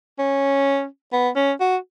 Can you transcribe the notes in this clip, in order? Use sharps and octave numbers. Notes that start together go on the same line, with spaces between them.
C#4
B3
C#4
F#4